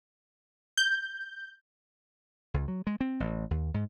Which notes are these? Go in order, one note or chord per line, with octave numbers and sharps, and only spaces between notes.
G6
C#2
F#3
G#3
C4
A1
D#2
G#2